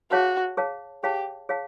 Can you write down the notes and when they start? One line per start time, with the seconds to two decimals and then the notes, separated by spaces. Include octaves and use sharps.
0.11 F#4 G#4 C#5 F5 A5
0.57 G#4 C#5 F5 A5
1.03 G4 G#4 C#5 F5 A5
1.49 G#4 C#5 F5 A5